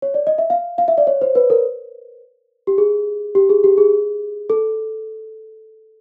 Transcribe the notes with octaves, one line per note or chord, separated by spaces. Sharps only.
C#5
D5
D#5
E5
F5
F5
E5
D5
C#5
C5
B4
A#4
G4
G#4
G4
G#4
G4
G#4
A4